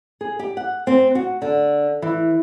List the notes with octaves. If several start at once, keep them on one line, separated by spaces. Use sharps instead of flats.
G#4
G4
F#5
C4
F#4
D3
E3